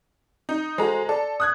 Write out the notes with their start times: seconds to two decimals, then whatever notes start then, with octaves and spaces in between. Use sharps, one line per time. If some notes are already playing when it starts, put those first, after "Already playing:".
0.49 D#4
0.78 G#3 F#4 A4 C5 A#5
1.09 A4 D5
1.40 D#6 F#6 G#6